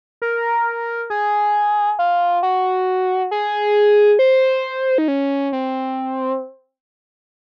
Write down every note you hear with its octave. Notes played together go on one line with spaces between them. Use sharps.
A#4
G#4
F4
F#4
G#4
C5
D#4
C#4
C4